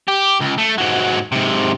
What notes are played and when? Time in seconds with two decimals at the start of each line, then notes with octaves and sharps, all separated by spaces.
0.08 G4
0.41 C#2
0.58 A3
0.78 G#2 F#3
1.32 G#2 C3